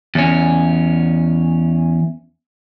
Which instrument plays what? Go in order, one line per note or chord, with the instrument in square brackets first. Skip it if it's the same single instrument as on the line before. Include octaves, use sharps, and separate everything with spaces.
[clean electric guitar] E2 C#4